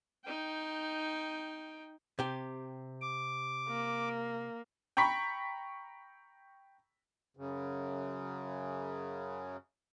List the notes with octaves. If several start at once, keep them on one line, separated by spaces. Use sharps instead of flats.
D#4 G5
C3 G4
D6
A#3
G5 A#5 B5 C#6 B6
F#2 C#3